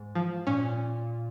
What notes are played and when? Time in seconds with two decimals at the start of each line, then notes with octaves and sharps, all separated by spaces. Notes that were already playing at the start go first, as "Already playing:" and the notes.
Already playing: G#2
0.15 F3
0.47 A#2 C#4